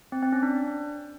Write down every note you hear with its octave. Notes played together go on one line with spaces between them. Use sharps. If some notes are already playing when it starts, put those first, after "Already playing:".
C4
C4
C#4
D4